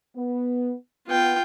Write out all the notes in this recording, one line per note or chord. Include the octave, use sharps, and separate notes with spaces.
B3
B3 F4 G5